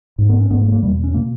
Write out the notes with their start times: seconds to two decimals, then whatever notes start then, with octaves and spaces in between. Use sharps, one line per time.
0.18 G#2
0.29 B3
0.40 C#4
0.50 G#2 B3
0.61 A#3
0.72 A#3
0.82 E2 B2 G3
1.03 C#4
1.14 B2 A#3